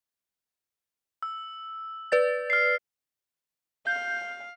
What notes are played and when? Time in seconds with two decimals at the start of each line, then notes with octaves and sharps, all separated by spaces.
1.22 E6
2.12 B4 D5 A6
2.50 F6 C7
3.87 F5 G6